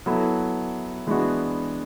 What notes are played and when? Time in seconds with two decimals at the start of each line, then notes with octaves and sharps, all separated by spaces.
0.06 F#3 B3 E4 A4
1.07 E3 G#3 B3 D4 F#4